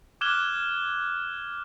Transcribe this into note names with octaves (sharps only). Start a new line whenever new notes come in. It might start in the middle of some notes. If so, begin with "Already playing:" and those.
D6 F6 F#6 G#6 E7 G7